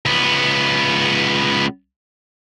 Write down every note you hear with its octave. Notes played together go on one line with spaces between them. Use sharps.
C#2 B3